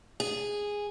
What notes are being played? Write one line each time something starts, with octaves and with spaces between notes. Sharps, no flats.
G#4